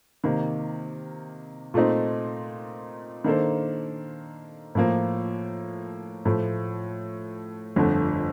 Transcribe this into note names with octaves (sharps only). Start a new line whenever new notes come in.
C3 D#3 A#3
A#2 A3 C4 D#4
D#3 A#3 D4 A4 C5
A2 F3 A#3
A2 F3 A3
G1 F2 D3 A3